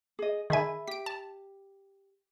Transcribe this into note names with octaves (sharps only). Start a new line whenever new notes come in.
G#4 D#5
D#3 G#4 E5 G#5 B5
G4 B6 D7
A5